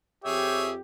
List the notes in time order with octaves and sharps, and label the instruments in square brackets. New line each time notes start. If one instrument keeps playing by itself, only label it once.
[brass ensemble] F2 G4 [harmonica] G#4 C#5 E5